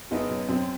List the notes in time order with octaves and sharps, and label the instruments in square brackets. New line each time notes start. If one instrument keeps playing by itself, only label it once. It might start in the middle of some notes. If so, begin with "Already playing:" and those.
[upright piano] F#1 B3 D#4
F#2
F#2 C4